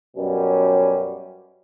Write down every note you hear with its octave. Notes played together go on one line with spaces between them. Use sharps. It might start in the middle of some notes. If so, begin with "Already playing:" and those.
F#2 B2 G3 C#4